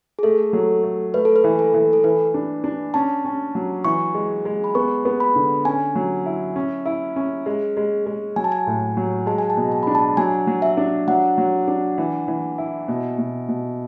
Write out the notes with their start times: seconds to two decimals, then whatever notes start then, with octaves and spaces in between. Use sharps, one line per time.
0.19 G#4
0.23 A3 A4
0.53 F#3
0.83 A3
1.14 A3 B4
1.25 A4
1.36 B4
1.44 E3
1.59 A4
1.74 E3
1.93 A4
2.04 E3 B4
2.34 D4
2.64 D4
2.94 C#4 A5
3.25 C#4
3.55 F#3
3.84 E3 C#6
4.14 G#3
4.45 G#3
4.64 B5
4.75 B3 C#6
5.05 B3
5.20 B5
5.35 D3
5.65 C#4 G#5
5.95 F#3
6.26 E4
6.56 C#4
6.85 E4
7.16 C#4
7.46 G#3
7.77 G#3
8.06 G#3
8.36 F#3 G#5
8.44 A5
8.52 G#5
8.67 A2
8.97 F#3
9.26 G#3 A5
9.38 G#5
9.50 A5
9.57 B2
9.72 A5
9.83 D4 B5
9.95 A5
10.17 F#3 G#5
10.47 F#3
10.62 E5
10.77 D4
11.08 F#3 F#5
11.38 F#3
11.68 D4
11.98 E3
12.28 E3
12.58 E4
12.88 B2
13.18 B2
13.49 B2